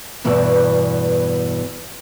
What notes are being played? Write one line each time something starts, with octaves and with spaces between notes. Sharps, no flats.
E2 G2 B2 E3